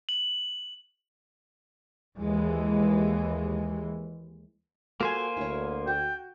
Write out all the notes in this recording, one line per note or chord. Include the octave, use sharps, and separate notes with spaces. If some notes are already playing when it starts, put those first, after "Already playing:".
F#7
D#2 E3 G#3
A#3 F4 F#4 A4 C5 G#5
D2 E4 C#5
F#4 G5